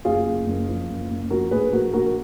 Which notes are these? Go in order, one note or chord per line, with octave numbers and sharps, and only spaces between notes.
F#1 F4 G#4
F#1
F#1
F3
F#1
F#1
F3 F#4 A#4
A#1 G#4 B4
A#1 F#4 A#4
A#1 F#4 A#4
A#4